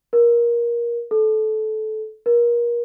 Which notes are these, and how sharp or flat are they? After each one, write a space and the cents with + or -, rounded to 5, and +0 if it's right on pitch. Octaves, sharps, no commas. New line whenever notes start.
A#4 +20
A4 -20
A#4 +30